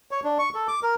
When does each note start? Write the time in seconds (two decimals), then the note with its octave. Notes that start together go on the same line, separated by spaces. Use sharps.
0.11 C#5
0.24 D4
0.39 C#6
0.55 A4
0.68 D6
0.83 A#4